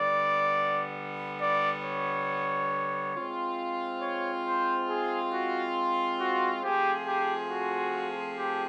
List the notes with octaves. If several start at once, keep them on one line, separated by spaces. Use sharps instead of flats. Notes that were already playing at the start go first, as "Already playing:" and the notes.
Already playing: D3 G3 B3 D5
D5
C#5
G#3 C4 F4
C#5
C5
G#4
F#4
F#4
F3 A3 C4 F4 G4 G#4
G4
F#4
G4